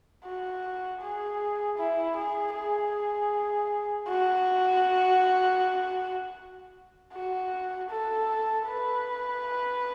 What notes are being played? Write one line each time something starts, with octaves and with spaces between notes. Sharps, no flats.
F#4
G#4
E4
G#4
G#4
F#4
F#4
A4
B4